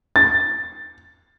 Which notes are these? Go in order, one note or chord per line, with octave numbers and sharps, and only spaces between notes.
A6